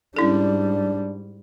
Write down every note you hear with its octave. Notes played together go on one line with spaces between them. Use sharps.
G#2 G3 C#4 D4 E4 A4